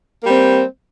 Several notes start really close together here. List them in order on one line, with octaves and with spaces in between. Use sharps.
A#3 G3 C4